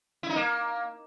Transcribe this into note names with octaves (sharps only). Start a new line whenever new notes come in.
E4
D#4
A#3